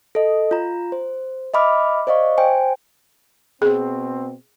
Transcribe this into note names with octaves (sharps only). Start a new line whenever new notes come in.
A4 D#5
F4 A#5
C5
D#5 E5 B5 D6 F6
C5 D5 D#5 F5 C#6
C5 G5 G#5
B2 C4 G#4